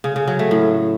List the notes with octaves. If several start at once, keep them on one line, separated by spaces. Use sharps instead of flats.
C#3
C#3
F#3
A3
A2